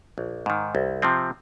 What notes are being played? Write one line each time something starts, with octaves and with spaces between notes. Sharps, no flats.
A#1
G#2 D#3
C2
C3 F3 C4